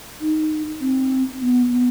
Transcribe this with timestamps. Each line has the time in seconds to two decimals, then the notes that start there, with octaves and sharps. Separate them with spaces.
0.21 D#4
0.81 C4
1.41 B3
1.70 B3